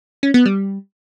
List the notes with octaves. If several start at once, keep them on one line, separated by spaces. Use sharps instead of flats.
C#4
B3
G3